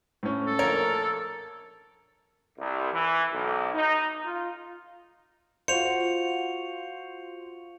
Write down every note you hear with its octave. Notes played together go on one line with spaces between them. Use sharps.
A2 C#4
A4
A#1 A#4 C#5
C2
E3
B1
D#4
F4
F4 F#4 C5 F5 C#7 F7